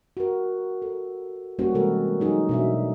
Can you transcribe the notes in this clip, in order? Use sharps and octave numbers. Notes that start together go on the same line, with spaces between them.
F#4 A#4
A4
G3 A#3 C#4 F#4 C5
C3 E3 G#3 F#4 A4 A#4
F#3 D#4 G#4
B2 D4 E5